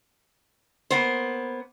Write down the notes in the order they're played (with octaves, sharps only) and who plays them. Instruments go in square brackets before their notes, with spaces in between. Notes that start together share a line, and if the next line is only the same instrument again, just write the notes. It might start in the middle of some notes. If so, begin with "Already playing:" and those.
[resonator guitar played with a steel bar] A#3 B3 C5